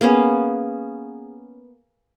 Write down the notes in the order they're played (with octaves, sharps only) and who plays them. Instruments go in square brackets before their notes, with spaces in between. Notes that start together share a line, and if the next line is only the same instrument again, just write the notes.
[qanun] A#3 B3 C#4 G#4